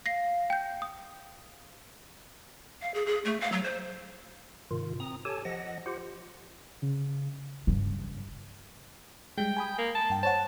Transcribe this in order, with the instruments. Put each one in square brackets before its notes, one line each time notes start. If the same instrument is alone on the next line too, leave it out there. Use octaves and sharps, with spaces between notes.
[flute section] F5 [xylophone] A#6 C7
[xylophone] G5 G6
D#6
[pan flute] F5
G#4
G#4
A3
F5
F#3
C5
[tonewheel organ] G#2 C3 D#3 F4
C4 A#5 D#6
G4 A4 C#5 G#5 A5
F3 D#5 F#5 A#6
F4 G4 C5 F#5
[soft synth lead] C#3
[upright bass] G2 C#3
[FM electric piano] G3 G#3 [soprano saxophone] G5
[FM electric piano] G#5 B5 D#6
[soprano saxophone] A#3
A5
[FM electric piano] G2 G5
[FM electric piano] C5 C#5 F#5 [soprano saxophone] A5